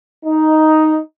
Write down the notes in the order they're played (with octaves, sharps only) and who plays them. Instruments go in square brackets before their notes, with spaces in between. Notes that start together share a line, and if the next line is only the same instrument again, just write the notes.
[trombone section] D#4